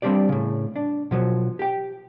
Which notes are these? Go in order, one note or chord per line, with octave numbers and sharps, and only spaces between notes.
G3 C4 D4 G4 D5
A2 C#3
D4
B2 F3 F#3
G4 G5